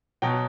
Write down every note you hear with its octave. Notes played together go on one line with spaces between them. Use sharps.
B2 F#3 G5